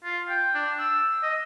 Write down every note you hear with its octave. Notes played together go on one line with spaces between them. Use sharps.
F4
G5
D4
E6
D#5